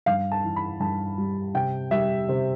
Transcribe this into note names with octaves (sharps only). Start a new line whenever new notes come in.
G2 F5
A5
E3
B5
G2 A5
G3
C3 G5
G3 E5
C3